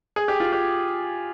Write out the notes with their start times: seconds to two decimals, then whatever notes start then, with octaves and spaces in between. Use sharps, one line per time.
0.16 G#4
0.28 G4
0.40 F4
0.53 G4